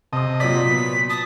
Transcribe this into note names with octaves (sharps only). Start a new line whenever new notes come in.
C3 D#5 A5 D#6
A#2 F#3 D5 B6
B3
A5 D#6